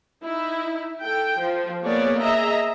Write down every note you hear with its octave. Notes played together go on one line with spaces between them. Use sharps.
D#4 E4
A4 G5
F3
A#3 B3 G#4 C#5 D5
G#4 D#5 E5 A#5